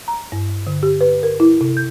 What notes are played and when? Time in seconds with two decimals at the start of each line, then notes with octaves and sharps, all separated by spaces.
0.08 A#5
0.32 G2
0.67 D3
0.83 G4
1.01 B4
1.23 A#4
1.40 E4
1.61 C3
1.77 G6